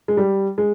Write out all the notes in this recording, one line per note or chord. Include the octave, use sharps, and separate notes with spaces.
G#3
G3
G#3